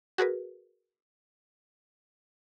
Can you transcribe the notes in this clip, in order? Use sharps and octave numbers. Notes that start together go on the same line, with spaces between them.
F#4 G#4 A#4 B4